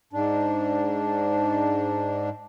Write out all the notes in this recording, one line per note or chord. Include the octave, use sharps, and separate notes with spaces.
G#2 D4